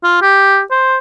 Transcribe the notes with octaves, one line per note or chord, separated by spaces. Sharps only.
F4
G4
C5